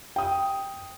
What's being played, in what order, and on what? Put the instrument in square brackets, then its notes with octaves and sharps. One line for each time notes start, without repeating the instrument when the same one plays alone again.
[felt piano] G5 D#6